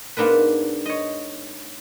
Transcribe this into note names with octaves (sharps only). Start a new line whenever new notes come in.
G#2 A#3 B3 D4 A#4 B4
C#5 D#5